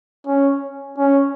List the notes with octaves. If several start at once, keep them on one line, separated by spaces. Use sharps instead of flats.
C#4
C#4